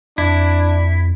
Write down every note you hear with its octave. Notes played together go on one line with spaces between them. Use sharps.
F2 D4 E4